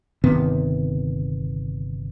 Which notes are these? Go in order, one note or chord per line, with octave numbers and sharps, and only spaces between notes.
G1 C3 D#3 B3